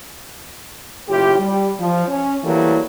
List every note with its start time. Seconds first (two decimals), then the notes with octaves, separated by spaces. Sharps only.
1.09 F#1 A2 E4 F4 G4
1.39 G3
1.80 F3
2.08 C#4
2.44 E3 F#3 G3 A3 A#3 E4